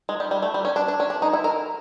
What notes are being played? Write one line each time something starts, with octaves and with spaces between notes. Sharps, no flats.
G#3
G3
G3
A3
G3
C#4
D4
D4
C#4
D4
D#4
E4
A#4